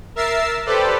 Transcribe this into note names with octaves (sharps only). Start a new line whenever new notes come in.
A#4 E5 E6 A6 C7
G4 A4 B4 C5 D5